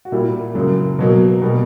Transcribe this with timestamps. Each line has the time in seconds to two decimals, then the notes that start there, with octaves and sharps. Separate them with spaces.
0.05 F#4
0.12 A#2 G3 A#3 E4
0.55 F#2 C#3 F#3 A#3
0.99 B2 F#3 A#3
1.42 B2 G3 A#3